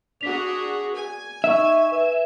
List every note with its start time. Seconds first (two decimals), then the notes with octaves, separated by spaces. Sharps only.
0.21 D4 F#4 G#4 B6 F7
0.94 G#5
1.44 D#4 D#5 E5 C#6
1.92 B4